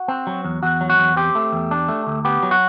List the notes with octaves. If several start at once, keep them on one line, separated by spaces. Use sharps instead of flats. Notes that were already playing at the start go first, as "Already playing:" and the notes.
Already playing: F#4
C4
F#3
E2
E2 F#4
F#3
F#4
E2
C4 G4
A3
E2
D4
A3
D2
B3 G4
F#3
F#4